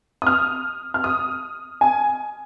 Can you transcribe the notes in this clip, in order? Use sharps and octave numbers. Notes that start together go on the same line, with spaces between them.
D#6
F6
F6
D#6
G#5